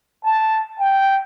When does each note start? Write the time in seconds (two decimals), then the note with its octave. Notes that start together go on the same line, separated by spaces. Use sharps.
0.23 A5
0.79 G5